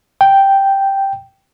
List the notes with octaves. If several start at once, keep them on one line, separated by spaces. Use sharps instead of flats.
G5